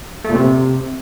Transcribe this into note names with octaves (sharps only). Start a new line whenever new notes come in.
A3
A#2
C3